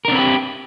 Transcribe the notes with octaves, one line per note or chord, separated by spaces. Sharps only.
C4 D4 G4 A#4 B4